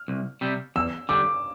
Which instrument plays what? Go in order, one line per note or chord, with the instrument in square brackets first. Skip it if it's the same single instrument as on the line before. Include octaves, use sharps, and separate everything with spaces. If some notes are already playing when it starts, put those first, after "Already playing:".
Already playing: [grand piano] F6
[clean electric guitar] C2
C3 G3
[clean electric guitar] E2 [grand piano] E6
[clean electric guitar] D3 G3 [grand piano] D6